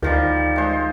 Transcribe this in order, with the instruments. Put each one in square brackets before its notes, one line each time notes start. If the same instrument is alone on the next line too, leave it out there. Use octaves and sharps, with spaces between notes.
[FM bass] D2 [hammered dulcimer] D#3 F3 G3
[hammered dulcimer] G#3 C5